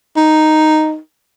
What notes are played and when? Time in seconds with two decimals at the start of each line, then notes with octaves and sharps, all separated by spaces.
0.17 D#4